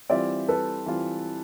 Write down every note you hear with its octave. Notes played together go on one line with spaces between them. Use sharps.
E3 G3 C4 F4 D5 E5
A4 B4
E3 G3 C4 F4